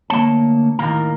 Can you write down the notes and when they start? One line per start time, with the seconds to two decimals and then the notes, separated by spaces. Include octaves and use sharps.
0.10 D2 A#3 C#5 A5
0.79 D#2 A2 A#3 A#4